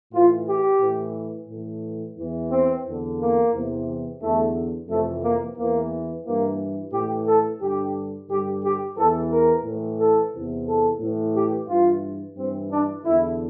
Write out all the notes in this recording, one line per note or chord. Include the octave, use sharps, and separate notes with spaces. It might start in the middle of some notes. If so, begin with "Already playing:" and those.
A2 E3 F4
G4
A2 E3
A2 E3
E2 E3
C4
E2 D3
A#3
E2 C3 E3
E2 D3 A3
F2 C3 E3 A3
A#3
E2 E3 A#3
G2 E3 A#3
A2 E3 G4
A4
G2 D3 G4
G2 D3 G4
G4
E2 E3 A4
A#4
A2 E3
A4
E2 C3 E3
A4
A2 E3
G4
G2 E3 F4
G2 E3 C4
D4
E2 D3 E4